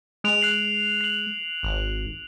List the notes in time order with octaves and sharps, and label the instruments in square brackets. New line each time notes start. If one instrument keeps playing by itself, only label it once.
[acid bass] G#3 [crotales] F#6 D7 F7
[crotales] F#6 C7 F#7
C7 F#7
[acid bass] G#1